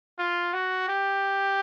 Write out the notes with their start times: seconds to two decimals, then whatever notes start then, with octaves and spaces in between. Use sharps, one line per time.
0.19 F4
0.53 F#4
0.89 G4